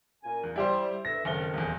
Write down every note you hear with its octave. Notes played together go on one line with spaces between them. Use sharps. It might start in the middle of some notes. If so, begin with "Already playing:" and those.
F#2 A#2 G#5
E2
G3 E4 G4 C5
D2 B4 E5 A#6
F#1 F2 D#3 G7
D#1 E2